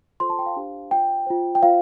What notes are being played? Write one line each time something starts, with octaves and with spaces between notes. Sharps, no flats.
F4 A4 C5 C6
A5
G5
F5
D4 G4 C5
F4 C5 G5
F4 C5
G5
F4 C5 F5